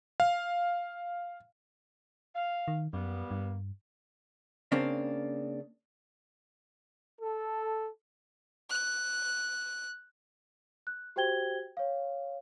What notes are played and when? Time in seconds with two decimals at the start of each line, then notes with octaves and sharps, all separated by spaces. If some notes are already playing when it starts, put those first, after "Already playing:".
0.20 F5
2.35 F5
2.68 D#3
2.93 F#2 G3 A#3 B3
3.31 G2
4.72 C#3 A#3 C4 D4
7.20 A4
8.69 F#6
10.87 F#6
11.16 F#4 G4 C5 G5 G#6 G7
11.77 C#5 F5